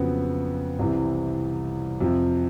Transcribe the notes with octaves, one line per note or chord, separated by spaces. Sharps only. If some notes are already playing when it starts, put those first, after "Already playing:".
Already playing: F2 C#3 F#3 B3
C2 C3 E3
F2 C3 F3